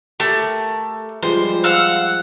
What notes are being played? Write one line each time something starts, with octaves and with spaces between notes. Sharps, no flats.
A3 G4 A#4
F3 G3 G#3 C5
F5 F#5 E6